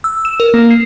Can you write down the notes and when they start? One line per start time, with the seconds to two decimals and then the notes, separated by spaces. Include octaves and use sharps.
0.04 E6
0.25 E7
0.40 A#4
0.54 A#3
0.70 C7